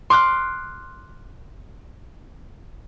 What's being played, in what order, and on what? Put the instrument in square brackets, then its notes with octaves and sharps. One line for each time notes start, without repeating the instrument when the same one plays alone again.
[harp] C6 D6 F6 F#6